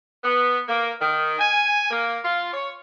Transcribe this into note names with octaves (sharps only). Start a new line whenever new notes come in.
B3
A#3
D#3
G#5
A#3
F4
C#5